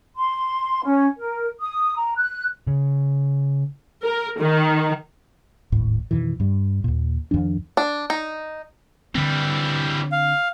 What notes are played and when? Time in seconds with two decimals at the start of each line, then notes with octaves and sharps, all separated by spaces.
0.16 C6
0.84 C#4
1.17 A#4
1.60 D#6
1.96 A#5
2.16 F#6
2.67 C#3
4.04 A#4
4.40 D#3
5.72 D#1 G#1 A2
6.11 F2 B2 D#3 E3
6.40 G2 G3
6.84 D#2 A#2
7.31 F2 D#3 F3 D4
7.77 D4
8.10 D#4
9.15 D3 E3 G3 C4
10.12 F5